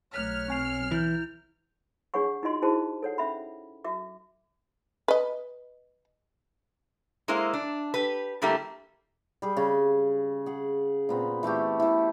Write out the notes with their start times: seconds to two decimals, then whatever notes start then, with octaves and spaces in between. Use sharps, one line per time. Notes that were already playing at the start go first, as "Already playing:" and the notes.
0.14 B1 A3 C#5 F6 F#6 B6
0.48 C4 G#5 C7
0.92 E3 E4 G6
2.14 D4 G#4 C#5 F#5 C#6
2.43 D#4 F4 F#4 D#5 C6
2.62 D#4 E4 F#4 G#4 C5 A5
3.03 A4 C#5 F#5
3.18 C#4 E5 B5
3.85 F#4 E5 D6
5.08 B4 D#5
7.28 G#3 A#3 E4 C5 D#5
7.53 D4
7.94 G4 B4
8.42 D3 G3 A3 A#3 E4 G4
9.42 G3 G#4
9.57 C#3 C#5
10.46 G#4 F#5
11.09 A#2 B3 C4
11.43 E3 A3 F#4 G4
11.80 E3 E4